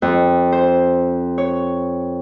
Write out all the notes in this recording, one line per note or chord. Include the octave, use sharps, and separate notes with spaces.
F2
C5
C#5